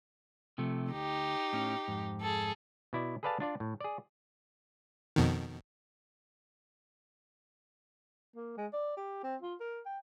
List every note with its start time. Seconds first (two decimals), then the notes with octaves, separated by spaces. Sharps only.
0.58 C3 F3 A3
0.92 D2 D#4 G4
1.53 A2 C#4
1.88 F2 G#2
2.21 G#4 A4
2.93 B2 E4 D5
3.23 G#4 A4 B4 D5 F5 A5
3.40 D4 F4 D5
3.60 A2
3.81 G#4 D5
5.16 F2 B2 D#3
8.36 A#3
8.57 G#3
8.73 D5
8.97 G4
9.23 C4
9.42 F4
9.60 A#4
9.86 G5